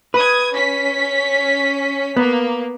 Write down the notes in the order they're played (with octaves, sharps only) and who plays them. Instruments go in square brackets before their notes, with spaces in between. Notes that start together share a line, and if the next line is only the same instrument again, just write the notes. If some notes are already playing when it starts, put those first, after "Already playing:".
[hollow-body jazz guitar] B4 [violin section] D#6 G#6
[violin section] C#4 B6
[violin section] A#3 [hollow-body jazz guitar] B3